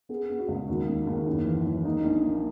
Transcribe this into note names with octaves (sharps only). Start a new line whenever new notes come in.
B3 G#4
B3
F#4
C#2
D#2 F#4
A#3
D#2
F#2 E4
E3
E3
A#3 D#4
A#1
A#3